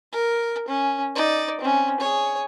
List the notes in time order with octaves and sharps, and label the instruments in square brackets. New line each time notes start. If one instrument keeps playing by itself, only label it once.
[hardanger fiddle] A#4
C#4
D#4 D5
C4 C#4
G#4 C#5